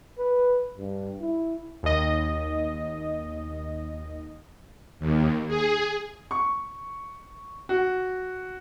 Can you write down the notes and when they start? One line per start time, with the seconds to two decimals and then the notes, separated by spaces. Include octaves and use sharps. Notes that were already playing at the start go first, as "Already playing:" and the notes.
0.19 B4
0.77 G2
1.21 E4
1.83 D#2 D#5
5.00 D#2
5.48 G#4
6.31 C#6
7.69 F#4